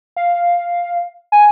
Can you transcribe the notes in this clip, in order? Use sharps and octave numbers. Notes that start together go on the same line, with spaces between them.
F5
G#5